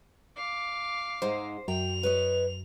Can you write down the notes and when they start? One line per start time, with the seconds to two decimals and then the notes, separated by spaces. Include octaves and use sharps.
0.37 F5 D6
1.22 G#2 G#3 D#4 C5
1.68 F#2 G5 F7
2.03 B4 C#5 D#5